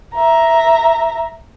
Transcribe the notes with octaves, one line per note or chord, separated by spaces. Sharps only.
E5 A#5